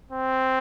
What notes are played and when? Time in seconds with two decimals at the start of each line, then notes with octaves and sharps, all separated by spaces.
0.11 C4